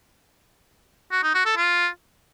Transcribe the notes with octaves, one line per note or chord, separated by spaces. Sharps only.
F#4
D#4
F#4
A4
F4